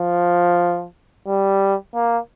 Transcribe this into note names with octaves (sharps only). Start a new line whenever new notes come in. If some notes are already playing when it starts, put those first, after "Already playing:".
Already playing: F3
G3
A#3